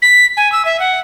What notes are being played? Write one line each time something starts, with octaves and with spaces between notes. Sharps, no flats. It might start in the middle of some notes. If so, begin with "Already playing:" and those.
B6
G#5
E6
E5
F#5